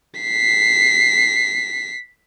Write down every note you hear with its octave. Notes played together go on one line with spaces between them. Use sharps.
B6 C7